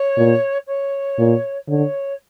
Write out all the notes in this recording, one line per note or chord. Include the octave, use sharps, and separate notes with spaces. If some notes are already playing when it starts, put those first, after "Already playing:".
Already playing: C#5
A#2
C#5
A#2
D3 C#5